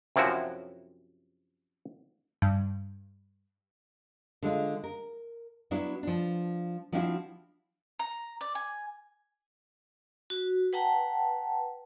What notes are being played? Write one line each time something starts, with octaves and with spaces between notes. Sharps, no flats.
F#2 C3 F3 E4 F#4
G2
D3 G#3 F4
A#4
F#3 B3 D4 E4
F3 D4
F3 B3 C4 D4 E4 F#4
A#5
D5
G#5
F#4
B4 F#5 G5 A5 A#5